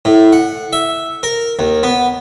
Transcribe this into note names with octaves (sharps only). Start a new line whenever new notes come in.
A2
F#5
E5
A#4
D#2
B3